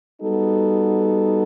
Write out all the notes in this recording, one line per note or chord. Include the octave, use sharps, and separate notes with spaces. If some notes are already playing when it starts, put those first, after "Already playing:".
G3 B3 D#4 F#4 A4